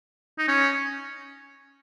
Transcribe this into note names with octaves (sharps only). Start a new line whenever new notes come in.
D#4
C#4